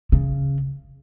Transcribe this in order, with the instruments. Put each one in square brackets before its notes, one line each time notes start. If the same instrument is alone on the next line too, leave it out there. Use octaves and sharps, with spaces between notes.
[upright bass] C#3